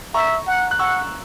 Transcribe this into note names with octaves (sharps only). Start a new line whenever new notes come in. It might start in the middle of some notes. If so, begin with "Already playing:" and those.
E5 A#5 C#6
F#5
F#6
F#5 C#6 E6